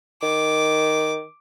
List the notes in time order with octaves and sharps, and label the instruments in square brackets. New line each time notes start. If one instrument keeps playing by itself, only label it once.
[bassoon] D#3 [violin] D6